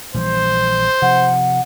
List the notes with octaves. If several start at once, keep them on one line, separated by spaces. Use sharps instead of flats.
A#1 E3 G3 C5
C3 F3 F#5